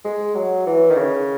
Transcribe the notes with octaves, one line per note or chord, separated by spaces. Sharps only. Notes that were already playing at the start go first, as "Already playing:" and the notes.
G#3
F#3
E3
D#3
C#3